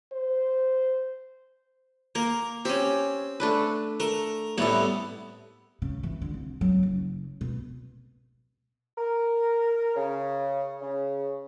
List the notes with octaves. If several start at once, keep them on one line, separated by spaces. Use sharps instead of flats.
C5
A#3 A#4
C4 C#4 G4
A3 D4 B4
A3 A#4
C2 A2 G3 B3 A4
C#3
E3
D3
C2
F#3
F#1
B2
A#4
C#3
C#3